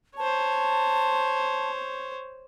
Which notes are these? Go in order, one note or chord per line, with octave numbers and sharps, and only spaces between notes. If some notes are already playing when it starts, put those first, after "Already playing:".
C5 C#5 A5